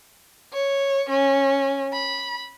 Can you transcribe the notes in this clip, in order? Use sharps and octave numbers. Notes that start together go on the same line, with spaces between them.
C#5
C#4
B5